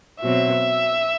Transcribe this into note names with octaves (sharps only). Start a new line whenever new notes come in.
B2 F#3 C4 E5